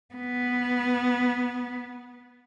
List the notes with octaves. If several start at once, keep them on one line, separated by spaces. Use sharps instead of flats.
B3